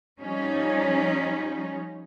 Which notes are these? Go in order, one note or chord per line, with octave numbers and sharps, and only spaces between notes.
F3 G3 C#4 D#4